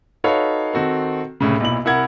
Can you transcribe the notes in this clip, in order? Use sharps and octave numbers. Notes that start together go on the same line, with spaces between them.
D#4 F#4 A4 B4 C#5 F5
D#3 C4 F#4 A4
C2 A2 C#3
B1 A#2 E4 F#7
C2 E4 A#4 F#5 G#6